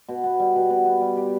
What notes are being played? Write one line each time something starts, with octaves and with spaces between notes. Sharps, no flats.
B2
B3
G3
B2
B2
B3
G3
G4